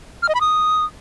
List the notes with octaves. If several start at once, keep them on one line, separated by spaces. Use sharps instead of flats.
F6
D#5
B5
D#6